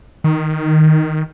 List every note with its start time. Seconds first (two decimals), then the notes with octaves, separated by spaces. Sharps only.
0.24 D#3